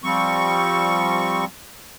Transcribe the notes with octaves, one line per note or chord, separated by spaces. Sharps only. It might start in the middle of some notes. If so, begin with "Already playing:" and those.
F3 G3 C4 C#6